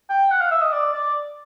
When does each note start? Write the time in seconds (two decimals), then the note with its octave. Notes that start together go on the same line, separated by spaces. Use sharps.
0.10 G5
0.31 F#5
0.41 F5
0.51 E5
0.62 D#5
0.73 D5
0.93 D5